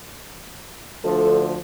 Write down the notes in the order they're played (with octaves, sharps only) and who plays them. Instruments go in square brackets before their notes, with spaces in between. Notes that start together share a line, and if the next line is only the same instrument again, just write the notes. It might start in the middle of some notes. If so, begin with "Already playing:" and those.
[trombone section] D2 D3 F3 [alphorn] A4